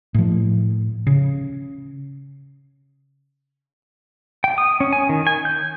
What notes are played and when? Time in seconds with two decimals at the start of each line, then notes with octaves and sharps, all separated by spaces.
0.15 A2 F3
1.07 C#3
4.44 G5
4.58 D#6
4.80 C#4
4.93 G#5
5.09 D#3
5.27 G#5
5.45 G6